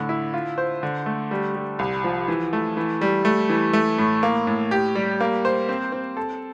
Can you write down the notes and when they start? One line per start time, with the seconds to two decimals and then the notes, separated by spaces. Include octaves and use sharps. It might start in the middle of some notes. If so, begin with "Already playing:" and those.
Already playing: A2 D3
0.09 E4
0.34 F4
0.58 C5
0.83 D3
1.06 A3
1.31 G3
1.55 G3
1.79 C2
2.04 F3
2.28 E3
2.53 A3
2.77 E3
3.01 G3
3.25 A3
3.49 E3
3.73 A3
3.98 A2
4.23 A#3
4.47 A2
4.71 G4
4.95 G3
5.20 A#3
5.45 C5
5.69 C4
5.92 C4
6.17 A4